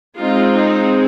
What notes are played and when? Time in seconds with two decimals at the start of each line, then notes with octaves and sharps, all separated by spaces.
0.19 G#3 C4 D#4 F4
0.54 D#4